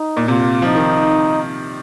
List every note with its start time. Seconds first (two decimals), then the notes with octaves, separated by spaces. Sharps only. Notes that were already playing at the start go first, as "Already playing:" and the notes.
Already playing: D#4
0.17 A#2
0.28 C3 F4
0.62 F3 D#4
0.75 D#3